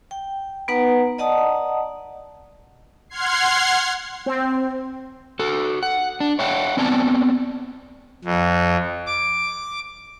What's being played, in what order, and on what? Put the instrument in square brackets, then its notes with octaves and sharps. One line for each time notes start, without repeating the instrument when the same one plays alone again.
[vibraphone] G5
B3 D#4 B4 F#5 A#5
D5 D#5 F#5 A5 A#5 D#6
[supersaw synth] F#5 C6 F6 G#6 C7
[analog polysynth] C4
[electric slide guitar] F#4 A4
F#5
D4
C#5 E5 F#5 G5
B3 C4 D5 G#5 A5
[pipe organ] F2
D6